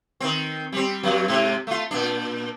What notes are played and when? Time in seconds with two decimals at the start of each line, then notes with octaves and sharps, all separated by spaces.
0.20 D#3 C4
0.72 G3 C4
1.03 F#2 F#3
1.28 G#2 C3
1.67 A3 F4
1.91 A#2 D4